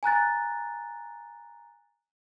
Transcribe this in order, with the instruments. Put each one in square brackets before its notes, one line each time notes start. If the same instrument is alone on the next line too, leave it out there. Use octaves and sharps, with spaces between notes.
[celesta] G#5 A#5 F#6 A6